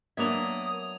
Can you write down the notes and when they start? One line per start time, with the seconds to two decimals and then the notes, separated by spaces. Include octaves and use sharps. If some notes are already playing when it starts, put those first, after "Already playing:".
0.17 F#3 A#3 B3 D4 E5 D#6 G#6 F7